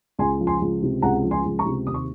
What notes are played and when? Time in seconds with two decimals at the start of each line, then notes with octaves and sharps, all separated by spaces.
0.19 C#2 G#5 C6
0.41 F3
0.47 G#5 C6
0.62 C#2
0.82 C3
1.02 C#2 F#5 A#5
1.24 F3
1.31 G#5 C6
1.46 C#2
1.59 A#5 C#6
1.66 C3
1.87 D#2 D#6
1.94 C#6